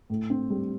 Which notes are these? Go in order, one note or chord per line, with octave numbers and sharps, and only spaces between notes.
A2
C4
G3